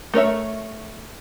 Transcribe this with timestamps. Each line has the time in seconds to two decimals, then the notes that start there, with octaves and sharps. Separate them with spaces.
0.14 A3 A#4 C#5 E5